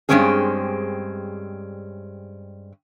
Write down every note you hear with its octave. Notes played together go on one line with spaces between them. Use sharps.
G2 D3 G#3 C4 C#4 G#4